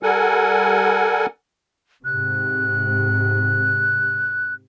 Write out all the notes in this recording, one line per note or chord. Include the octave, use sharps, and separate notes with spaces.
G3 A4 A#4 F#5 G#5
G#2 C3 F#6